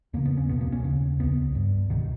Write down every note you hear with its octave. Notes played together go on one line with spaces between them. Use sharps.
E2 C#3 A#3
B3
C#4
C#2 B2 B3
A#3
C#4
D#2 C#3
C#2 C#3 B3
G2
C#2 B2 D#3